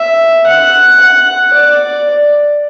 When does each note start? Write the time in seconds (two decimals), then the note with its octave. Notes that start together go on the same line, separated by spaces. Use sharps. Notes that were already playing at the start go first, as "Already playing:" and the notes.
Already playing: E5
0.47 F#5
1.01 F#5
1.54 D5